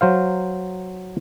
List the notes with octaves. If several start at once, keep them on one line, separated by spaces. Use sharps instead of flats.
F#3 C5 F5